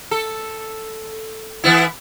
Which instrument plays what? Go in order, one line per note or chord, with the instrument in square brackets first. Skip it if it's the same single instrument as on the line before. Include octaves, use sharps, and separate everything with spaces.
[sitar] A4
E3 B3 E4